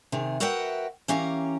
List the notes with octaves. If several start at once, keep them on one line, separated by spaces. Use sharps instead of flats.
C3 D#3 G#4
F#4 A#4 B4 E5 F#5 G5
E3 A#3 C#4 G4 F5 A#5